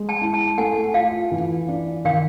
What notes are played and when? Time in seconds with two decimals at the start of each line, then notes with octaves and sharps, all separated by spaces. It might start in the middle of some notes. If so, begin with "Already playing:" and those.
Already playing: G#3
0.09 G5 A5
0.21 E4
0.33 G5 A5
0.58 A3 F#5 G#5
0.94 F4 F5 G5
1.32 E3
1.68 D4
2.05 D#3 F5 G5